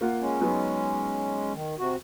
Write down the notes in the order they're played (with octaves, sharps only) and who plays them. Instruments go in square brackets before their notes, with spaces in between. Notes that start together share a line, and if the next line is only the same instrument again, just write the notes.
[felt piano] A#3 F4 F#5
[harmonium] G#3 C#4
[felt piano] F#3 B3 D#4
[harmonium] D#3
C3 F#4